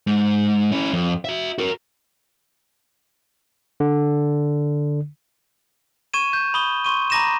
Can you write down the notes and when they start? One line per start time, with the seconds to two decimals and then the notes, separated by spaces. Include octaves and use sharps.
0.07 G#2
0.72 C#4 E4
0.93 F2
1.25 F#4 E5
1.58 F#4 A#4
3.80 D3
6.13 C#6 G#6 D#7 E7
6.33 G6
6.54 B5 D#6 G7
6.85 C6 C#6 D#7
7.10 A#5 B5 D6 A#6 D#7 E7